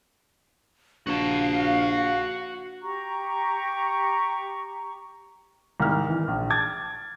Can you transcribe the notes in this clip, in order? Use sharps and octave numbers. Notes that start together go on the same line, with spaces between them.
A#1 F#4 F5 A5
G4 A#5 C#6
C2 G#2 D#3 F6
E3
A#1
A5 D6 G#6 A6